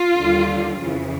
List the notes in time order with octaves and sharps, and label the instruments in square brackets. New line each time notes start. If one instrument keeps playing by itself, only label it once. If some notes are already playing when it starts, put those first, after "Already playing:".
Already playing: [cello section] F4
D#2 D3 G3
F2 C#3 E3